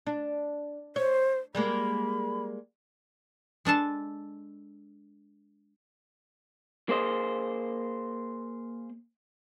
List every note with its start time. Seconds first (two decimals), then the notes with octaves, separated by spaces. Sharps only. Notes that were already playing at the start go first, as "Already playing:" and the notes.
0.07 D4
0.96 C5 C#5
1.55 G3 G#3 A#3 B5
3.65 G#3 D4 A4 A5
6.89 A#3 G#4 C5 D#5